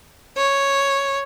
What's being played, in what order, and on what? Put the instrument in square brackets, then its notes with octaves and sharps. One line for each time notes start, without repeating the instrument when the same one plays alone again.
[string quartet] C#5